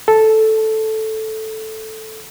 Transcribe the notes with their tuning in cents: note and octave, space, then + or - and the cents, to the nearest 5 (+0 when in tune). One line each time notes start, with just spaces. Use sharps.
A4 -5